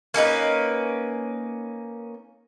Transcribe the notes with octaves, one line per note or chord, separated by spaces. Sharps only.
A#3 C#4 D#4 B4